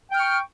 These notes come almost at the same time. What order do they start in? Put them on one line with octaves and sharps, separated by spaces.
G5 F6 C#6